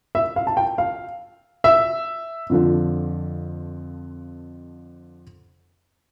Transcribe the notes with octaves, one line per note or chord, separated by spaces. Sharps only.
E5
F5
A5
G5
F5
E5
F2 D3 F3